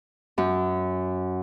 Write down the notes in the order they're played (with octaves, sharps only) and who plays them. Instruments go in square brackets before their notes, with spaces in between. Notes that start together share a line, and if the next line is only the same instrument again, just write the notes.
[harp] F#2